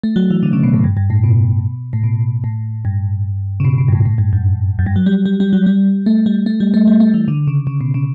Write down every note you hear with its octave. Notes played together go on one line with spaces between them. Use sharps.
A3
F#3
E3
D3
C#3
B2
A2
G2
G2
A2
B2
A2
B2
A2
G2
C#3
B2
B2
G2
A2
A2
G2
F#2
F#2
G2
F#3
G3
G3
G3
F#3
G3
A3
G3
A3
G3
A3
G3
A3
E3
D3
C#3
C#3
B2
C#3